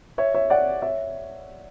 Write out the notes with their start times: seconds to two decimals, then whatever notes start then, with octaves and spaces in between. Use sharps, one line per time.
0.18 C#5 E5
0.34 C#5 E5
0.50 D5 F#5
0.82 C#5 E5